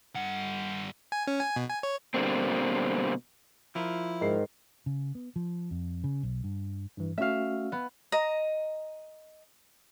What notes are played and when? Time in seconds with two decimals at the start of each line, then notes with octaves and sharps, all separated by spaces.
0.16 G2 F#5
1.12 G#5
1.27 C#4
1.40 G#5
1.56 B2
1.69 G#5
1.83 C#5
2.14 B2 D3 F3 G3 A#3 C4
3.75 F3 E4 F4 A#4
4.21 G#2 D#3 C7
4.86 C#3
5.15 B3
5.36 F3
5.71 F2
6.04 C#3
6.23 B1
6.44 G2
6.97 G2 E3
7.18 A3 C#4 F#4 E5 F5
7.72 B3
8.12 D#5 A#5